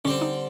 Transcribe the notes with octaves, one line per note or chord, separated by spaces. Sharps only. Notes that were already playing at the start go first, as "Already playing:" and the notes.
D3 G3 C4 C#4
D#4